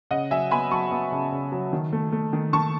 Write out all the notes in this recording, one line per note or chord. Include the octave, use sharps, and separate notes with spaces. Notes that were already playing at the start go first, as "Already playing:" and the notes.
C#3 D#5 F#5
F#3 E5 G#5
B3 G#5 B5
F#3 A5 C#6
B3
C#3
C#3
F#3
D#3
A3
A3
D#3
D#3 A5 C#6